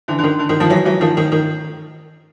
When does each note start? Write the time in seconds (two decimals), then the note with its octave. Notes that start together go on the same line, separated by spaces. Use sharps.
0.08 D3 E3
0.19 D3
0.24 D#3
0.39 D3
0.49 D#3
0.60 D#3 F3
0.70 E3 F#3
0.85 E3 F#3
1.01 D#3 F3
1.17 D#3
1.32 D#3